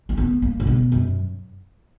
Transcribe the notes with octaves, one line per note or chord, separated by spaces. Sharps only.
A#3
B3
A#3
C#3
B2
F#2